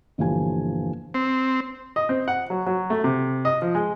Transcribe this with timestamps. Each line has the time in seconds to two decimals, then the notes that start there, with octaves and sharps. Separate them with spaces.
0.18 G1 A#2 E3 F3 G4 G#5
1.14 C4
1.96 D#5
2.09 C4
2.28 F#5
2.50 F#3
2.66 F#3
2.90 A3
3.04 C3
3.45 D#5
3.62 F3
3.75 G#3